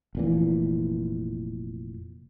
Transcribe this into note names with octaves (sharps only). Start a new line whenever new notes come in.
F1 A#2 E3